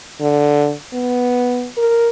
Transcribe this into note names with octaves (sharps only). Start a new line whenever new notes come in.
D3
B3
A#4